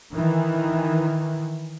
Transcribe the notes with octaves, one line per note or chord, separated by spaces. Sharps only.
D#3 E3